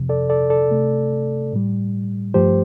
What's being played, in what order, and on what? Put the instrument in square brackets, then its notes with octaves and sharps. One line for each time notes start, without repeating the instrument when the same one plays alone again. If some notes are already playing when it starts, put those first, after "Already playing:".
Already playing: [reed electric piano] F2 C3 F3
A4 D5
A4 D5
A4 D5
C3 A3
A2 G3
G2 F3 A3 G4 C5